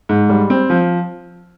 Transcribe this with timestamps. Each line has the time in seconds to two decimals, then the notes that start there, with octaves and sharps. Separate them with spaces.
0.09 G#2
0.29 G3
0.50 C4
0.70 F3